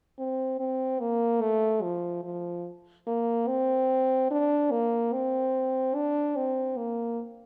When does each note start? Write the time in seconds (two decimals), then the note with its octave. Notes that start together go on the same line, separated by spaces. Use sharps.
0.19 C4
0.60 C4
1.00 A#3
1.41 A3
1.82 F3
2.24 F3
3.07 A#3
3.47 C4
4.31 D4
4.71 A#3
5.13 C4
5.95 D4
6.36 C4
6.77 A#3